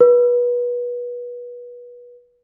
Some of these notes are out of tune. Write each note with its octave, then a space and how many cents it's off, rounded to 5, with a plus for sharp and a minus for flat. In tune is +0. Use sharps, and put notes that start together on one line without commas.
B4 -25